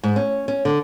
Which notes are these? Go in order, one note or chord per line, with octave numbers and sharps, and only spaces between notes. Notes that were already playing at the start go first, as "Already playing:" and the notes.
G#2
C#4
C#4
D3